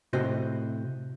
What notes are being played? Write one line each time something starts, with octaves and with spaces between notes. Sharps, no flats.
A2 C3 F#4 C5 D#5